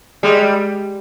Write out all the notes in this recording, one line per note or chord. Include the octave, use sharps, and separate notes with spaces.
G3 G#3